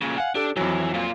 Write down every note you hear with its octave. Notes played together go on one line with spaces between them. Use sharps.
A#2 C#3
F5 F#5 G#5
D4 G4 A4
F2 E3 F#3
A#2 F4